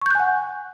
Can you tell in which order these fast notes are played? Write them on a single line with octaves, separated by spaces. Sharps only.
C#6 G6 F#6 G#5 F#5